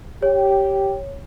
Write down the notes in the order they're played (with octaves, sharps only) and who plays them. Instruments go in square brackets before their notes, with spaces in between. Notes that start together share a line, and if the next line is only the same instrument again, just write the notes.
[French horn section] G4 [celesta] C#5